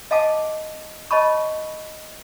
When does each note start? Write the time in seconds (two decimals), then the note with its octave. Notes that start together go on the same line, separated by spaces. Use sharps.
0.11 D#5 F5 F#5 G#5 A5 D6
1.11 C#5 D#5 A5 B5 C#6